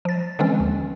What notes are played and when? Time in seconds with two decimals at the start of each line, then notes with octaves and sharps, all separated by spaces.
0.05 F3 A6
0.39 D3 E3 F3 G#3 C4 C#4
0.60 D#2